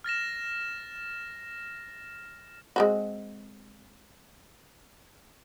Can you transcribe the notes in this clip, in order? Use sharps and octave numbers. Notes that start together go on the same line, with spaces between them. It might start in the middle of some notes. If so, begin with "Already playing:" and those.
F6 A6 A#6 E7
G#3 C4 F#4